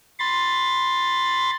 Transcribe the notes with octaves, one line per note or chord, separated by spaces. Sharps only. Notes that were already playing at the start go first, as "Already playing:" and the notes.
B5 C6 A6